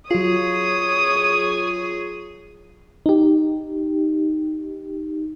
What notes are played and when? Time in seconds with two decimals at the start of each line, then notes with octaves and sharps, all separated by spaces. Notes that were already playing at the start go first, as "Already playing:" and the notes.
0.11 F#3 F4 G#4 C#5 D#6
3.06 D#4 G4